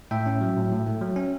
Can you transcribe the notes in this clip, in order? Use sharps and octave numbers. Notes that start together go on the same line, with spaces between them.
A2 E5 G5
C#4
F#3
A2
A2
A3
F#3
C#4